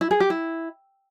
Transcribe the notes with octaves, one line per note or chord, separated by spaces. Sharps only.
E4
G#4
G4
E4